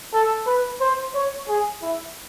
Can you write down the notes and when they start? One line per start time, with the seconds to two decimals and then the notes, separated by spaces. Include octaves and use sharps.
0.14 A4
0.47 B4
0.81 C5
1.15 C#5
1.48 G#4
1.82 E4